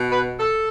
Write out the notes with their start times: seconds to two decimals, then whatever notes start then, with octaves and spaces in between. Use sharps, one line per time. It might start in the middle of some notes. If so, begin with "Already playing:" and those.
Already playing: B2
0.11 B4
0.39 A4